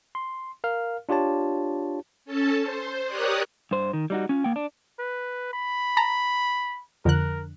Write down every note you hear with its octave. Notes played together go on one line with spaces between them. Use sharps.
C6
A#4 F5 F6
D4 F4 G4 C#5 A5
C#4 A4 A5
C5
G4 A#4 C#5 D5 D#6 F#6
G2 C5
D#3
G3 D#4 F#4
C#4 F4
A#3 G5
D4
B4
B5
A5 A#5
F2 D3 A#4 F#6